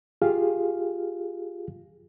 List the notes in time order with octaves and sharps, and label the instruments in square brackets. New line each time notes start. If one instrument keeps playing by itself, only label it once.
[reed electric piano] F4 G4 G#4 F5